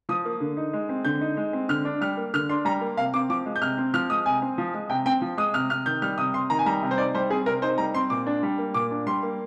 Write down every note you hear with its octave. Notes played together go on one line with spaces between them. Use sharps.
F3 D#6
A#3
D3
D#4
G#3
C4
D3 G6
D#4
G#3
C4
D3 F6
D4
G3 F6
A#3
D3 F6
D4 C6
G3 A#5
A#3
C3 F5
C4 D6
F3 D6
G#3
G6
C3 F6
C4
F3 F6
G#3 D#6
C3 G#5
C4
F3
G#3
C3 G5
C4 G5
F3
G#3 D#6
C3 F6
C3 F6
D#3 G6
G3 F6
C3 D#6
C3 C6
D#3 A#5
G#5
G3 A#5
C3
C5
D#4 D5
G3 C5
C4 G#4
C3 A#4
D#4 C5
G3 A#5
C4 C6
A#2 D6
D4
G3
A#3
A#2 D6
D4
G3 C6
A#3